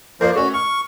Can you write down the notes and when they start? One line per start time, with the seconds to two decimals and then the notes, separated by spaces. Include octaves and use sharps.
0.21 F3 A#3 A#4 C5 D5 D6
0.35 A3 C#4 F#4
0.54 C#6 F6